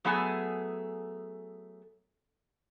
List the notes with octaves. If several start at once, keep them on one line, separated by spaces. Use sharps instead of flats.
F#3 A3 B3 G#4 A4 G#5